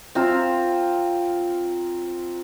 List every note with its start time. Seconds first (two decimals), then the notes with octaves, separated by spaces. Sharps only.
0.15 C4 F4 A#5